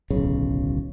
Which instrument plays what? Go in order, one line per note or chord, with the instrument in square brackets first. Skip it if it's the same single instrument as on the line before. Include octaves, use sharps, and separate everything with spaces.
[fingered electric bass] D1 B1 C#3